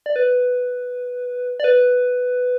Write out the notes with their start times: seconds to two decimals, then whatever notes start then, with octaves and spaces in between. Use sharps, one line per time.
0.06 D5
0.16 B4
1.60 D5
1.64 B4